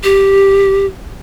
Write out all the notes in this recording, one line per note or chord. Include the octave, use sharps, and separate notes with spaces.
G4